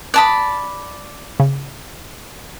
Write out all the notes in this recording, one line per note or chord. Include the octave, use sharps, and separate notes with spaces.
D5 A5 B5 D#6 F#6
C#3